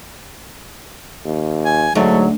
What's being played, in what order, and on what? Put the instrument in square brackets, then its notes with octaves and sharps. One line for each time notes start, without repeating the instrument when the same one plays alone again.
[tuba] D#2
[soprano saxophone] G#5
[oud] D2 [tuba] G#2 [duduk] F#3 [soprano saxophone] A3